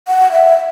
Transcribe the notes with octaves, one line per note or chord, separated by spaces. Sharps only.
F#5
E5